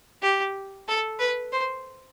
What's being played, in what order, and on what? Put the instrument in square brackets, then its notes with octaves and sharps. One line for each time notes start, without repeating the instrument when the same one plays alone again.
[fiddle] G4
A4
B4
C5